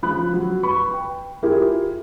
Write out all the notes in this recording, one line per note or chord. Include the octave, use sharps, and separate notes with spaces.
C#3 F3 B5 F#6
F#3
B4 B5 C#6
G5
E4 F4 G4 G#4 A#4